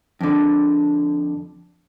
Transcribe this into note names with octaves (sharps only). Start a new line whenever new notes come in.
F2 D3